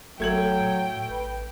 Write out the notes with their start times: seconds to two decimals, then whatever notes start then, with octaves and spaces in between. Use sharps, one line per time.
0.20 G#1 F#3 A3 G5 G#6 F#7
0.60 A2
1.09 A1 B4